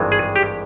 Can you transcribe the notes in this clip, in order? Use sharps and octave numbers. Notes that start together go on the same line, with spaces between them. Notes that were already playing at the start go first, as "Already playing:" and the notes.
Already playing: G#1 G2 E3 G#3
G#4
G4